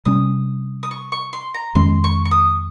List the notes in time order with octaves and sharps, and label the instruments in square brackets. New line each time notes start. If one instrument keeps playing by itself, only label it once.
[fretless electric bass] C3 G3 C#4 [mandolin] D#6
[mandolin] D#6
C#6
C#6
C6
A#5
[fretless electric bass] F2 D#3 G#3 C#4 [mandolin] C6
[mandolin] C#6
C#6
D#6